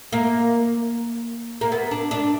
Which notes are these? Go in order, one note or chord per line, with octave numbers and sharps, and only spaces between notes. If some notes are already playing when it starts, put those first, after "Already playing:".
A#3
A#3
B3
D4
D4